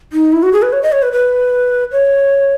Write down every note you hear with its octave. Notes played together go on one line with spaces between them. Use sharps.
D#4
E4
F#4
G#4
B4
C#5
D#5
C#5
B4
B4
C#5